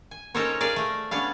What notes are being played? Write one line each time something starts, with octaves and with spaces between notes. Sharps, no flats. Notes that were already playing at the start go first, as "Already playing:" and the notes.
G#5
C#4 D#4 A4 A#4 C5 C#5
G#4 A#4 D5 F5
A3
B3 C#4 D4 F5